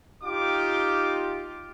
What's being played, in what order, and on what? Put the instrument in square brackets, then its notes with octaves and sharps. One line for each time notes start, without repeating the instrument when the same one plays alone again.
[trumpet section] D#4 F4 G4 D6